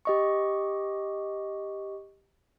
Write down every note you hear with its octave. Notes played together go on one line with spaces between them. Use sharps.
G4 D#5 C#6